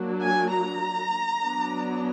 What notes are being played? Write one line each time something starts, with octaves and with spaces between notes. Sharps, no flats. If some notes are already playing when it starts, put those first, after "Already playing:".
Already playing: F#3 A#3 D4
G#5
A#5
F#3 B3 D4